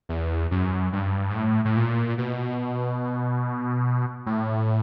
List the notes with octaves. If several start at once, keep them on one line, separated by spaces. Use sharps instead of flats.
E2
F#2
G2
G#2
A2
A2
A#2
B2
A2